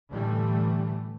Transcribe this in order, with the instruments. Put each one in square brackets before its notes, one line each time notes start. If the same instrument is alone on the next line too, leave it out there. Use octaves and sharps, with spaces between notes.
[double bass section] A2 D3 E3 G3 A3